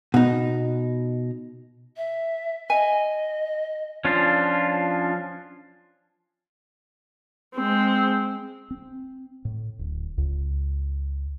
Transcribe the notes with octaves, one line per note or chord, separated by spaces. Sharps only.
B2 D#4
E5
D#5 E5 G#5
F3 C#4 D4 F4
G#3 C4
C4
A2
D1
C#2